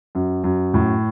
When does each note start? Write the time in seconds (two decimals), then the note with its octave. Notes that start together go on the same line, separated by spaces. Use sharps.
0.15 F#2
0.44 F#2
0.74 A2